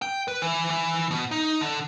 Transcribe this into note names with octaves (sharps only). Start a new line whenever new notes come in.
G5
B4
E3
E3
B2
D#4
D3